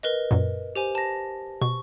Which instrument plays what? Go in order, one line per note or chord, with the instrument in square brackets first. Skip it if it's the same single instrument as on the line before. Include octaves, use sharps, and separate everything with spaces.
[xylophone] A#4 B4 D#5
[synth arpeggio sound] F#2 A#2
[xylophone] G4 C5 G#5
A5 A#6
[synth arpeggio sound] B2 [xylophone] C#6